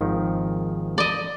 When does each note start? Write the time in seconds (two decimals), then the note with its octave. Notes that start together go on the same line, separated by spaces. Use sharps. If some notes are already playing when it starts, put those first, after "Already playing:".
0.01 G#1 D#3 F3
0.98 D5 D#5